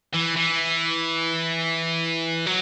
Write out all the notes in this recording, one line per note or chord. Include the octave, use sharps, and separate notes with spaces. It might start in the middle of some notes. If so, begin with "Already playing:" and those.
E3
E3
F#3